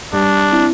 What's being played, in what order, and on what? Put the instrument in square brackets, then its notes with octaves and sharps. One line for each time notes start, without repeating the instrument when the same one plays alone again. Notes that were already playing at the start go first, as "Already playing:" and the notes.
[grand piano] G3 [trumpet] D4
[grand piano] C4 E4